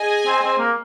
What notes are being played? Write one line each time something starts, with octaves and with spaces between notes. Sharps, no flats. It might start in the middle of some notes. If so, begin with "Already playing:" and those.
Already playing: G#4 D#5 G#5
C4
C4
A#3